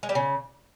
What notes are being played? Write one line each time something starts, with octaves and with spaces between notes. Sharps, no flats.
G#3
G3
C#3